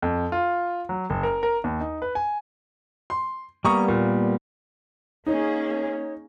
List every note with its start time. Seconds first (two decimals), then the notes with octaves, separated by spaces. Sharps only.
0.02 F2
0.32 F4
0.89 F#3
1.10 F#1
1.23 A#4
1.43 A#4
1.64 D#2
1.80 D#4
2.02 B4
2.15 G#5
3.10 C6
3.65 G3 A#3 B3 A#5 C#6 D#6
3.88 A#2
5.26 A#3 C#4 D#4 G#4 C#5